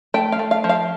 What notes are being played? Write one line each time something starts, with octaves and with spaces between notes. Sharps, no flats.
A3 G5
F5
A3
F5
F3
F5